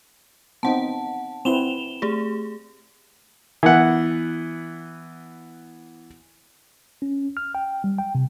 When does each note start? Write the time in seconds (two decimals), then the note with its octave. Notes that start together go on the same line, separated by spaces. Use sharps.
0.63 B3 C4 D#4 F#5 A5
1.45 C4 E4 B4 E7 F7 G7
2.02 A3 G4 G#4
3.63 E3 B3 F#5
7.02 C#4
7.37 F6
7.55 G5
7.84 G3
7.99 G5
8.15 C3